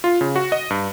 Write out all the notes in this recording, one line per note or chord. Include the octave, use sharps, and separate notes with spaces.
F4
C#3
F#4
D#5
G2